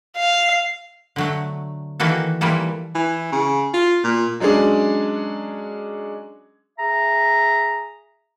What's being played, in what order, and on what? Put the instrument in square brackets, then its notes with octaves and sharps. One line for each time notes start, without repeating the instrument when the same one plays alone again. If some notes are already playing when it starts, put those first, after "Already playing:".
[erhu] F5
[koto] D3 F#3 A3
D#3 E3 A#3 F#4 A4
E3 F3 G3 A#3 A4
[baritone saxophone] E3
C#3
F4
A#2
[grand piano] F#3 G#3 C#4 D4 G#4
[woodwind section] G#4 E5 A#5